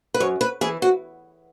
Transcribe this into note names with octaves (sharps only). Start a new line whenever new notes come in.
B4
F#2 C#5
B4
E3 G#4
F#4